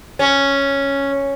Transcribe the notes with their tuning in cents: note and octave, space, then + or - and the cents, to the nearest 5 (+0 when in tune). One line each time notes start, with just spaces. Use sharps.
C#4 +0